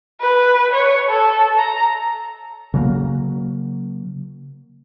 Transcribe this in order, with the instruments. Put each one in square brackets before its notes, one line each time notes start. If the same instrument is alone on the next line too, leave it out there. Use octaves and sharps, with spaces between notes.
[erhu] B4
C#5
A4
A#5
[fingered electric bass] C#3 F#3 A#3